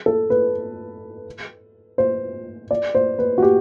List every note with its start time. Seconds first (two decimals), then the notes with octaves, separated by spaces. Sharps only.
0.06 A4
0.30 B4
1.98 C5
2.71 D5
2.95 C5
3.19 B4
3.38 F#4
3.42 G4